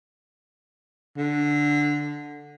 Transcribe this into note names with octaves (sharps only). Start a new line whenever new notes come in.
D3